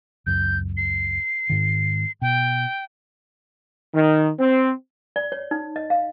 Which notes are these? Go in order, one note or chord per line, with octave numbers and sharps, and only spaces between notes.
C#2 F#2 G6
C7
G#2 D#3
B2 G5
D#3
C4
D5
C#5
D#4
D#5
F5